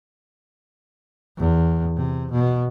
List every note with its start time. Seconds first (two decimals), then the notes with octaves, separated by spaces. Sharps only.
1.37 E2
1.96 C3
2.31 B2